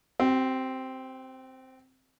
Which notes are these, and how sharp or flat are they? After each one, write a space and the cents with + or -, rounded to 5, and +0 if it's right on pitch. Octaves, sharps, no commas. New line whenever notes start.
C4 +0 G4 -45